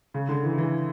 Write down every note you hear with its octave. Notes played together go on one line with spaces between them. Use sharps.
C#3
D3
E3
E3